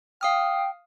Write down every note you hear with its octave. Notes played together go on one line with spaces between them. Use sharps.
F5 G5 D#6 F6